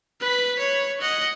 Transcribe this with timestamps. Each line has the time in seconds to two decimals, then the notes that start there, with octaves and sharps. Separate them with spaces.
0.21 B4 B6
0.59 C#5
1.01 D#5 F#5